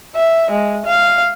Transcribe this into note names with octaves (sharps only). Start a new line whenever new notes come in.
E5
G#3
F5